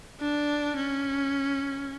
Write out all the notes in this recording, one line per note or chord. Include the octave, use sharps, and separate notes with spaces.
D4
C#4